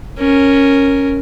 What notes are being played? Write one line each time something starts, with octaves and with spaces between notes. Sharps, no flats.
C#4 A#4